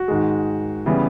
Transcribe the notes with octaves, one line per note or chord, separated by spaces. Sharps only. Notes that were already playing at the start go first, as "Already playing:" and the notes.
Already playing: F#4
G#2 D#3 G#3
C#3 E3 G3 B3